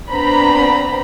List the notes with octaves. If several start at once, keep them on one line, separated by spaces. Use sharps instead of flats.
B3 C4 D4 C5 A#5 B5